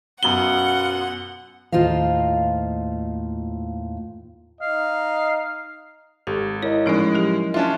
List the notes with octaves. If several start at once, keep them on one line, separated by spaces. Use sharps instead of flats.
F#2 B2 B3 C#4 F4 F#5 F#7 G7
D#2 A2 F4 C5 D#5 F5
D#4 D#5 F5
G#1 G4 A4
E4 A#4 C#5 D#5
A2 F3 G#3 C#4 D#4
F#3 G4
C#4 D4 F4 E5 A5